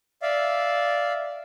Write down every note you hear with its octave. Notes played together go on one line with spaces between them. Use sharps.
D5 E5 F5